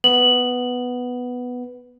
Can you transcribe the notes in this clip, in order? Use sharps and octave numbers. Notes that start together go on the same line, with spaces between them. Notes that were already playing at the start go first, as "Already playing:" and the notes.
B3 F#7